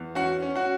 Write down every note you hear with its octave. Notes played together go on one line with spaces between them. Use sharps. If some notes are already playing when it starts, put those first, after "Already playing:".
Already playing: E2
C#4 F#4 F#5
C#4
F#4 F#5